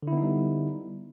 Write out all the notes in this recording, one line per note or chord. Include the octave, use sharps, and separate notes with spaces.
D3 G3 B3 D#4 E4